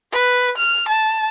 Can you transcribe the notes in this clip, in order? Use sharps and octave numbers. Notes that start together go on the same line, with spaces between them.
B4
F6
A5